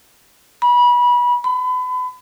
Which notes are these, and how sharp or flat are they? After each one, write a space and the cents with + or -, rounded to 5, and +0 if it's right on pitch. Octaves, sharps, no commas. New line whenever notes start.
B5 -25
B5 +35